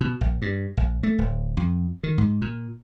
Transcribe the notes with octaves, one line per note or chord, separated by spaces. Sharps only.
B2
A#1
G2
A#1
A3
D1
F2
D#3
G#2
A#2